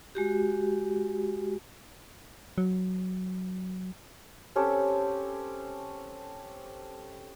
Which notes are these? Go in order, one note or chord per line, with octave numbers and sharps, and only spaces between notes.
G#3 F#4 G4
F#3
C4 C#4 G4 A4